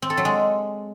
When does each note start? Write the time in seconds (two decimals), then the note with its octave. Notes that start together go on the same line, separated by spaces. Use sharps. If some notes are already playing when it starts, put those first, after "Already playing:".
0.02 C4
0.10 A4
0.17 F#3
0.25 G#3